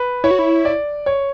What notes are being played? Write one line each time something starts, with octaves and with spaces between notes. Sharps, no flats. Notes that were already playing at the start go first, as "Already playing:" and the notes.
Already playing: B4
E4 C#5
F#4
E4
D5
C#5